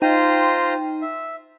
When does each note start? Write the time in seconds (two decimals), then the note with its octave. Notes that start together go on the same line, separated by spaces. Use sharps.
0.02 D#4 F4 C5 G5 A#5
1.02 E5